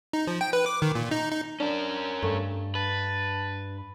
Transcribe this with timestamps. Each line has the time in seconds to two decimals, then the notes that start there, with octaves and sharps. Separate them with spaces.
0.13 D#4
0.27 F3
0.41 G5
0.53 B4
0.66 D6
0.82 D#3
0.95 A#2
1.11 D#4
1.32 D#4
1.60 C#4 D4 A#4
2.23 G2 A3
2.75 B4 A5